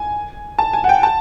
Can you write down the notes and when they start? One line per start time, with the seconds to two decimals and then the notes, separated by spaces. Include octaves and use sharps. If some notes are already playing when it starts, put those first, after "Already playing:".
Already playing: G#5
0.59 A5
0.73 G#5
0.84 F#5
0.89 G5
1.03 A5